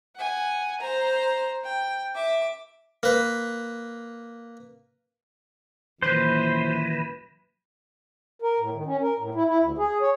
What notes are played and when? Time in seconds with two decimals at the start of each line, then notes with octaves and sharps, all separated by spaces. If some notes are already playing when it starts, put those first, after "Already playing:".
0.16 F#5 G#5
0.81 C5 A#5
1.64 G5
2.15 E5 D6
3.03 A#3 B4
6.02 F#2 A#2 D#3 E3 E4 B4 C5
8.42 A#4
8.60 A2
8.74 D#3
8.86 C#4
9.01 A#4
9.19 A2
9.35 E4
9.47 E4
9.60 D2
9.78 G#4
10.01 C#5